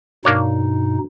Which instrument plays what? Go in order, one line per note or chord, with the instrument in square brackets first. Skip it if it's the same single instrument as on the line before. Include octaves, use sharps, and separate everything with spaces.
[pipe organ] G2 B2 D#4 [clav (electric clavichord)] A#3 D4 C#5